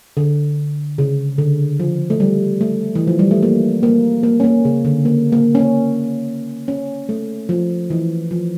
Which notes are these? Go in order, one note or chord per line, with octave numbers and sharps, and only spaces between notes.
D3
C#3
D3
F3
A3
G3
A3
E3
F3
G3
A3
A#3
A#3
A#3
C#4
A#3
C#3
D3
A#3
A#3
C#4
A#3
C#4
A3
F3
E3
F3